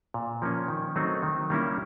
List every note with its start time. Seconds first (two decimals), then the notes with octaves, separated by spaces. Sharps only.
0.14 A#2
0.42 F3 A#3 C#4
0.68 D#3
0.96 F#3 A3 C4 D#4
1.23 D#3
1.50 G3 A#3 C#4 E4